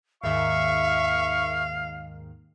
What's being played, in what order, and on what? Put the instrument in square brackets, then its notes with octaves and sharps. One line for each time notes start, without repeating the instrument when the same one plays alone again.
[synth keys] D#2 G#2 D#3 [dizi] E5 [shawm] F5 [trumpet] C#6